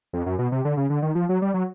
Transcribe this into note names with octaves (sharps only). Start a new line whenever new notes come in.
F2
F#2
B2
C3
D3
C#3
D3
D#3
F3
F#3
G3
F#3